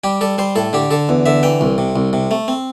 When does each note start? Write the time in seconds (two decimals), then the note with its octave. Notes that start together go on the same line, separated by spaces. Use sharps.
0.04 G3 G4
0.21 G3 A4
0.38 G3 C5
0.56 A2 A4
0.73 D3 G4
0.91 D3 A4
1.09 E2
1.26 D3 E5
1.43 E3 G5
1.61 C2
1.78 C3
1.96 C2
2.13 C3
2.31 A3
2.48 C4